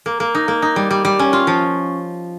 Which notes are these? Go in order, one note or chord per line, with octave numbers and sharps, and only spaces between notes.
A#3
A#3
D#4
A#3
D#4
G3
G3
G3
C#4
F4
F3